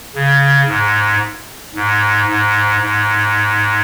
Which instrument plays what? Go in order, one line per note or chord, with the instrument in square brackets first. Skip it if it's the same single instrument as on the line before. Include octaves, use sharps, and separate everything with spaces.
[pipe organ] C#3
G#2
G#2
G#2
G#2